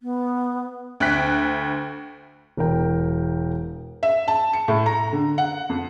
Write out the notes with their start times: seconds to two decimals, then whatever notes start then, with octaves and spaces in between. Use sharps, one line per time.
0.03 B3
1.00 D2 G5 F#6 B6
2.57 E1 A#4 G5
4.03 E5
4.28 A5
4.53 C#7
4.68 A2
4.86 A#5
5.13 D3
5.38 F#5
5.69 F2